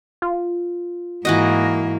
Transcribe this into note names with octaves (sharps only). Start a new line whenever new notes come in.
F4
G#2 E3 A#3 F#4 D#5